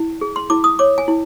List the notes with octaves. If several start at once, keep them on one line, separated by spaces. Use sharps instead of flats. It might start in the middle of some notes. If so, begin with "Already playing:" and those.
Already playing: E4
G#4
C6
E4 D6
D#6
C#5 D6
G#5
E4